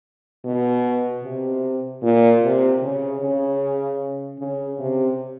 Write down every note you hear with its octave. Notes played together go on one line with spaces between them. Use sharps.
B2
C3
A#2
C3
C#3
C#3
C#3
C3